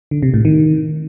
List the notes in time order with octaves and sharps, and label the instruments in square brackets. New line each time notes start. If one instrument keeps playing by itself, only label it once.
[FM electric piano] D3
C3
A2
D#3